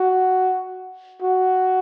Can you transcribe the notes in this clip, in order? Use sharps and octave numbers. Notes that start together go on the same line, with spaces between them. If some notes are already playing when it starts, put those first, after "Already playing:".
Already playing: F#4
F#4